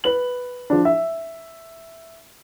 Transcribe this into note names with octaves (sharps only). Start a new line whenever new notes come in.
B4 F#7
F3 D4
E5